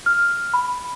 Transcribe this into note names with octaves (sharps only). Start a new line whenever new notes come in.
F6
B5